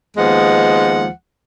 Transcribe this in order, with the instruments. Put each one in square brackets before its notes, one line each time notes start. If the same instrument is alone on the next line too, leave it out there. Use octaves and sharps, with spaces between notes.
[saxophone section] D#2 F3 G#3 B3 F#5